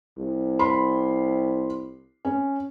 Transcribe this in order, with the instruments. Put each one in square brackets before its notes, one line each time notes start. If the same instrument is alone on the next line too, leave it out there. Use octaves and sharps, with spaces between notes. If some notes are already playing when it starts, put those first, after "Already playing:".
[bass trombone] C2
[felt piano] B5 C6
C#4